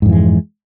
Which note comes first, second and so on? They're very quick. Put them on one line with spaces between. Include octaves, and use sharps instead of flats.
G#2 F2 E3 G#3